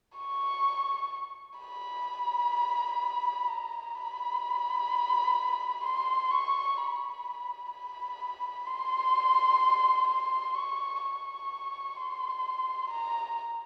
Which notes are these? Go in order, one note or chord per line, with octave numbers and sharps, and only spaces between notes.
C#6
B5
A#5
B5
C6
C#6
B5
B5
C6
C6
C#6
C#6
C6
A#5